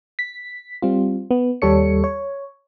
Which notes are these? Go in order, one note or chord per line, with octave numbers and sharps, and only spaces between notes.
B6
G3 C4 F4
B3
D#2 G3 A4 C#5 C#7
C#5